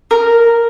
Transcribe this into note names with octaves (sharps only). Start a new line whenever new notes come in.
A#4